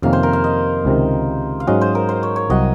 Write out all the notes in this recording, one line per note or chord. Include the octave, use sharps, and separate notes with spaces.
F2 C3 D#3 A#3 C#4 F5
C5
A#4
F5
D#5
C#2 C3 D#3
F5
G#2 F#3 C#4 F#4 D#5
C5
A#4
C5
C#5
C#5
C2 C3 F#3 C4 F#4 D#5